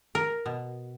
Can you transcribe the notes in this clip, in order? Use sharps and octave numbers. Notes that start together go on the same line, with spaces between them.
A#4
B2